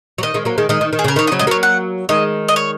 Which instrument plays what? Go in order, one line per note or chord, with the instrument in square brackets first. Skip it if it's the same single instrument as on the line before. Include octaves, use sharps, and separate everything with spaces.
[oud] F#3
[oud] D#3 [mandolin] D#5
[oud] D#3 G#3
F#3 A#3
D#3 G#3
[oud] D#3 G#3 [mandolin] D#5
[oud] D#3
D#3
[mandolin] G#4
[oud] C#3 [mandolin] A#4
[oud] D#3 [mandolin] C#5
[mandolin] D#5
[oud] C#3 F#3
[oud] G#3 [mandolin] D#5
[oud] F#3 A#3 [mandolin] C#5
[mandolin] F#5
[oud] D#3 G#3 [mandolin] D#5
[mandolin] D#5
C#5